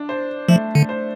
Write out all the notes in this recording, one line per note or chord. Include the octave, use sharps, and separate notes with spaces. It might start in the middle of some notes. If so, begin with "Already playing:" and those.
Already playing: D4
C5
F3 A3
D3
C5